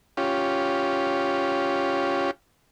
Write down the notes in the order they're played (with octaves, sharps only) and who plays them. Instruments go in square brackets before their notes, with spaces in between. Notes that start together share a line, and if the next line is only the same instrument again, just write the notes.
[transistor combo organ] C#4 F4 G4